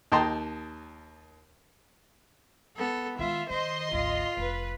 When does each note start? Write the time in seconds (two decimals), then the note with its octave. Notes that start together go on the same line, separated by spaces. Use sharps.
0.12 D#2 D#5 G5 A5 A#5 C6
2.76 B3 A4
3.18 D#3 G#3 F4 E5
3.50 D#3 C5 D#5 C6
3.92 G#1 D2 F4
4.37 F1 B4